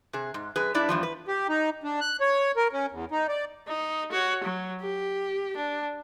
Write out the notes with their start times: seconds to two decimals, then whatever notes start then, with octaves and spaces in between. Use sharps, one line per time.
0.13 C3 G#4
0.34 G#2
0.56 F#2 G#4 B4
0.74 G2 D4 E4 D5 E5
0.89 E2 G2 F3
1.03 B4
1.28 G4
1.49 D#4
1.84 D4
2.01 F#6
2.21 C#5
2.56 A#4
2.73 C#4
2.91 E2
3.11 D#4
3.28 D5
3.68 D#4
4.12 F#4 C#5
4.44 F#3
4.81 G4
5.56 D4